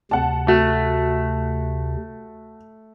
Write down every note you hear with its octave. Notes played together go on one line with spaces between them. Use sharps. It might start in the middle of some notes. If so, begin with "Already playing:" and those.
D2 C3 F#5 A5
A3 F#4